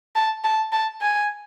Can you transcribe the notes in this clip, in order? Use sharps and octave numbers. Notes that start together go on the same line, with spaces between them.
A5
A5
A5
G#5